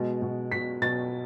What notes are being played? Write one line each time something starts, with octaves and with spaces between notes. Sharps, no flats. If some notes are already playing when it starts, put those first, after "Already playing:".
Already playing: B2 G#3
B2
B2 B6
B2 A6